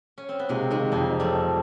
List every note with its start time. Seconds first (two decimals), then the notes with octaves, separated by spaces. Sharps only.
0.18 C#4
0.29 C4
0.39 B3
0.49 C3 G#3 A#3
0.70 D#3 G#3 A#3
0.92 F2 A#3 C4
1.13 F2
1.20 G3 A3
1.35 F2